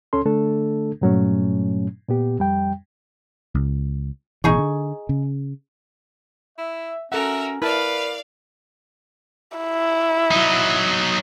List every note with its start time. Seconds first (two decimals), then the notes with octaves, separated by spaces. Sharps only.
0.13 C#2 C#4 A4 C6
0.25 D3 A3 D4 A4
1.01 G2 A#2 F#3 A3 C#4
2.09 A#2 B3 G4
2.39 F2 G3 G5
3.55 C#2
4.44 A1 B2 E3 D#4 G#4 C#6
4.58 D3
5.09 C#3
6.58 E4 E5
7.12 C#4 F#4 A4 A#4 E5 F#5
7.62 E4 A#4 B4 D5 F5 A5
9.58 E4
10.31 F#3 D#4